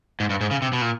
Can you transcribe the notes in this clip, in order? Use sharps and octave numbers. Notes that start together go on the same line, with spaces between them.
G#2
G2
G#2
C#3
C3
B2
A#2